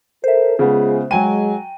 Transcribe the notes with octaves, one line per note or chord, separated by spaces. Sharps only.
A4 A#4 C5 E5
C#3 G#3 B3 F4 G#4
F#3 G#3 G5 G#5 D#7